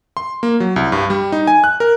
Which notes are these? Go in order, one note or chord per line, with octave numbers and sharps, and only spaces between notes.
C6
A#3
F#3
C2
G2
G3
D#4
G#5
F#6
A#4